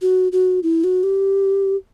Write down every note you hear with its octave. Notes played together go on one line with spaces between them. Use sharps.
F#4
F#4
E4
F#4
G4